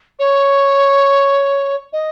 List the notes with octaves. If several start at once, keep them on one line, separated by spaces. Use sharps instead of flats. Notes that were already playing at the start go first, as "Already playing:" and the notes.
C#5
D#5